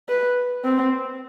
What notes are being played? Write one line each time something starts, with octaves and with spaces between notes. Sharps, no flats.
B4
C4